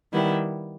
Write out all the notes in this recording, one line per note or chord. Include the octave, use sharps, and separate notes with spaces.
D#3 G3 B3 E4